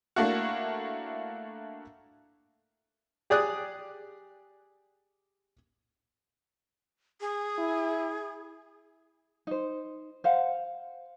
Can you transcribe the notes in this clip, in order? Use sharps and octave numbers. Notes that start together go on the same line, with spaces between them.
A3 A#3 D4 E4 F#4
G4 G#4 D5 D#6 F#6
G#4
E4
D#4 C5
C5 F5 F#5